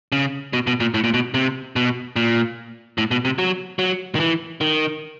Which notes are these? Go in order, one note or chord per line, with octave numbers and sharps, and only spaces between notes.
C#3
B2
B2
A#2
A2
A#2
B2
C3
B2
A#2
A2
B2
C3
F#3
F#3
D#3
E3
D#3